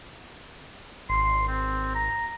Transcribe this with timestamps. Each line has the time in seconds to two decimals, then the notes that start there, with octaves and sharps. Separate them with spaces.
1.10 G#1 C6
1.48 C4
1.95 A#5